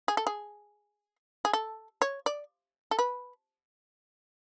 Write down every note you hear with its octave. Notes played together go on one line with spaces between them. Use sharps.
G#4
A4
G#4
G#4
A4
C#5
D5
A4
B4